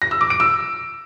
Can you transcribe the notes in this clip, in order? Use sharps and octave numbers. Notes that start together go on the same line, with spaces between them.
A#6
E6
D6
D7
E6